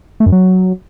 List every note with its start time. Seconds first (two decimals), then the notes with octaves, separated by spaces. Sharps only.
0.20 A3
0.26 F#2
0.32 F#3